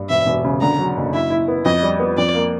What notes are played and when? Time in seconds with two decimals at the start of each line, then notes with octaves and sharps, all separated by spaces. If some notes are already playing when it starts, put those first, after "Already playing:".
Already playing: G2
0.09 E1 E5
0.26 E1
0.44 C#3
0.61 D3 A#5
0.79 F#3
0.97 F#1
1.13 E4 E5
1.30 E4
1.48 B3
1.65 F2 D#5
1.83 G3
2.00 B3
2.18 F2 D5
2.34 A#3